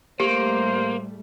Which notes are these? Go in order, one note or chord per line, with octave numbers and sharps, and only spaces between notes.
A2 G3 A3 A#3 G4 C5